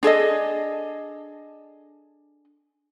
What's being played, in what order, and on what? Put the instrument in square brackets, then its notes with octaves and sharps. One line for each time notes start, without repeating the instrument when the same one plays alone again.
[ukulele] D4 G#4 A4 D#5